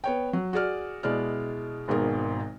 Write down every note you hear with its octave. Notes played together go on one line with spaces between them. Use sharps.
B3 C#5 G5
F#3
F#4 G#4 D5 F6
B2 G#3 E4 D5 F6
G#1 G#2 B2 A#4